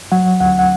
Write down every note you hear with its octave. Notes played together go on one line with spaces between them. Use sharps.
F#3 F#5
D2 F#5
F#5